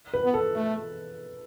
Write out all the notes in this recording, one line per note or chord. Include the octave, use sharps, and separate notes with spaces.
B4
B3
A4
A3